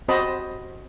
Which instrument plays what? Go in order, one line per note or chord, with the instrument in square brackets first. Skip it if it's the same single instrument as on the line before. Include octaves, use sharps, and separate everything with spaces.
[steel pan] C4 F#4 C5 D#5 A5 B5